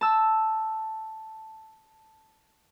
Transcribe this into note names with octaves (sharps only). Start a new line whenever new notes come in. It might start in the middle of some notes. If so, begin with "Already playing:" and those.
A5 E6